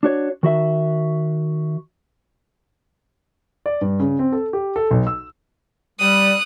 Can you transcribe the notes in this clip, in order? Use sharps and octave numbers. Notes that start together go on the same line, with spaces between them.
D4 F#4 C#5
D#3 F#4 E5
D5
G2
C#3
C4
A4
G4
A4
B1
E6
G3 D#6 F#6